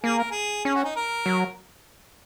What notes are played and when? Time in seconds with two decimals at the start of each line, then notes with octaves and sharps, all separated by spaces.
0.04 A#3 G#4
0.18 A#4
0.31 G#4
0.65 C#4 G#4
0.75 F#4
0.85 D#4
0.96 A#4
1.26 F#3